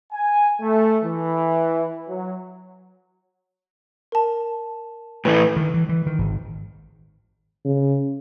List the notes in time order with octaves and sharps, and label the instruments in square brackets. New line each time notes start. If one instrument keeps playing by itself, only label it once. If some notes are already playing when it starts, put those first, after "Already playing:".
[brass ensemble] G#5
A3
E3
F#3
[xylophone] A#4 A5
[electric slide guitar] A2 E3 A3 [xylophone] B4
[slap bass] D#3
E3
E3
D#3
G#1
[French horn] C#3